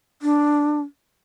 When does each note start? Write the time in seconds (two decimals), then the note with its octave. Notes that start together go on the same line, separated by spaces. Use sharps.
0.22 D4